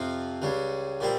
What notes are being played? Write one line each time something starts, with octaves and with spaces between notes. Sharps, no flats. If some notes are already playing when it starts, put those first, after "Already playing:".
Already playing: F2 C3 F3 F5
C#2 C#3 G3
A#2 G3 C4